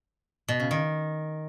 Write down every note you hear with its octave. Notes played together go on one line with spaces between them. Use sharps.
B2
C#3
D#3